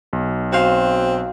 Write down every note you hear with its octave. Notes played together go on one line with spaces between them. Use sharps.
B1
C4 F#4 F5